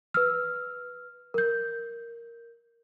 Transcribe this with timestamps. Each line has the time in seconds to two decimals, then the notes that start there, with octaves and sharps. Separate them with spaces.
0.14 B4 E6 F6
1.34 A#4 G6